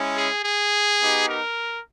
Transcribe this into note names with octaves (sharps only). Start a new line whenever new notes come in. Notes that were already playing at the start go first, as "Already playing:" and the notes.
Already playing: G#3 C#4 E4
G#4
G#4
B3 D#4 G4
A#4